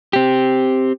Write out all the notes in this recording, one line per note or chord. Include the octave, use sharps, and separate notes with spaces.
C4 G4